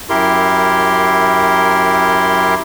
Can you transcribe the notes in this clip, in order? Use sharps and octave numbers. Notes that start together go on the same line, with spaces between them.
F#2 E4 G4 A#4 C6